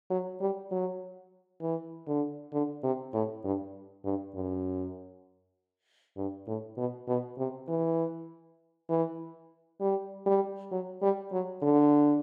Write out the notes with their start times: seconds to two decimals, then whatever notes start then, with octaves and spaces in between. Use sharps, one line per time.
0.10 F#3
0.41 G3
0.71 F#3
1.61 E3
2.07 D3
2.53 D3
2.83 C3
3.13 A2
3.44 G2
4.05 G2
4.35 F#2
6.17 G2
6.47 A2
6.77 B2
7.08 B2
7.38 C3
7.68 E3
8.90 E3
9.80 G3
10.26 G3
10.71 F#3
11.02 G3
11.32 F#3
11.62 D3